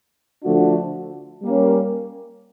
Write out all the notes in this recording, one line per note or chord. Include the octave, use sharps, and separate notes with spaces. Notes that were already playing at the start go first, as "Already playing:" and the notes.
D3 F3 A3 D4 F#4
G3 A#3 C#4